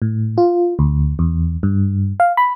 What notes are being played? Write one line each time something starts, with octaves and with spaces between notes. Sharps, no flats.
A2
F4
D2
E2
G2
F5
B5